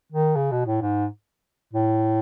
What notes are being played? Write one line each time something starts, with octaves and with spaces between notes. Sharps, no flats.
D#3
C#3
B2
A2
G#2
A2